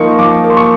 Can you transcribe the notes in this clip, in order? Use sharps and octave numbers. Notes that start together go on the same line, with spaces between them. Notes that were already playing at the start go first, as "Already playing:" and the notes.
Already playing: F3 A#3 D#4 C6 C#6
F3 D6
A#3
C6
C#6